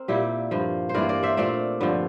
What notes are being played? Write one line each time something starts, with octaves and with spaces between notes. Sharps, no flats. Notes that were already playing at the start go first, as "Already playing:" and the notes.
Already playing: C4 A#4
A#2 G3 A#3 E4 G4
G2 F3 A#3
C5
G2 E3 A#3 A#4 D5
A#4 D5
C5 E5
A#2 A3 C4 D5 F5
G2 D3 F3